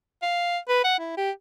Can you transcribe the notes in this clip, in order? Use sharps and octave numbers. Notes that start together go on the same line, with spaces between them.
F5
B4
F#5
E4
G4